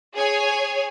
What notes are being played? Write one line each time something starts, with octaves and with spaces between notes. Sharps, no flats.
G#4 C#5 G#5